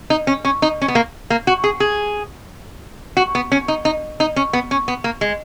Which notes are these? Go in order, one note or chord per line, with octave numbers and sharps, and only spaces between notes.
D#4
C#4
C#4
D#4
C#4
B3
A#3
A#3
F#4
G#4
G#4
F#4
B3
C#4
D#4
D#4
D#4
C#4
B3
C#4
B3
A#3
G#3